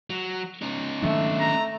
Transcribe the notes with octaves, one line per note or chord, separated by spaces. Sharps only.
F#3
C#4 D#4
D#3 F#3 A3 D4
A#5